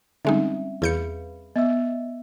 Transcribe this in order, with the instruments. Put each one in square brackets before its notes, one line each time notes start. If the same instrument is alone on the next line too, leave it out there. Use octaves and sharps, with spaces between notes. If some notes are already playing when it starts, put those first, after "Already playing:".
[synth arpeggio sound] D3 G#3 D#4 [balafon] G3 C4 C#4 [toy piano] E5 F#5
[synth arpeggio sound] E2 G6 C#7 [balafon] G#4 [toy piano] B4 F5 B5
[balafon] B3 [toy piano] D#5 E5 E6